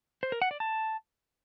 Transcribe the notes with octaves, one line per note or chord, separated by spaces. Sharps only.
C5
A#4
F#5
D5
A5